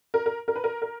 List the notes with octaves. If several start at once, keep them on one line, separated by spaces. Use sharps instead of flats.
A#4
A#4
A#4
B4
A#4
A#4